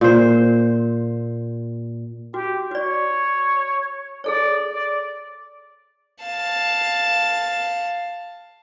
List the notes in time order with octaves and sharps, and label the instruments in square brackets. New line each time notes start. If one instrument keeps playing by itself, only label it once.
[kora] A#2 C5
[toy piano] F#4 [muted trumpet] G4
[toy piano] F#4 D5 [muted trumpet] C#5
[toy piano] G#4 A4 C#5 [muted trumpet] D5
[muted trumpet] D5
[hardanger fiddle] F5 A5